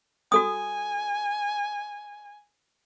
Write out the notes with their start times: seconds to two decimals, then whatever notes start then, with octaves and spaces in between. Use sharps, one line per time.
0.32 F#4 A4 G#5 D#6